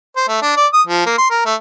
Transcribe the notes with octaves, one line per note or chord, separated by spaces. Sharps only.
C5
A3
D4
D5
D#6
F3
A#3
C6
A#4
A3